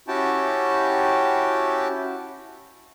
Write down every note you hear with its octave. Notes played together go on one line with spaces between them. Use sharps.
C#4 E4 F#4 G4 G5 A5